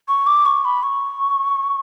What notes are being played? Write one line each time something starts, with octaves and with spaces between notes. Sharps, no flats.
C#6
D6
C#6
B5
C#6